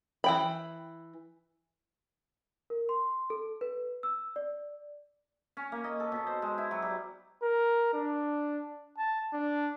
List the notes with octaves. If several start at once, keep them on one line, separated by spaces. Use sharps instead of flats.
E3 G5 B5
A#4
C6
A4
B4
E6
D5
C#4
A#3
D#5
A4
B2
C5
G#3
E4
F#3
G3
A#4
D4
A5
D4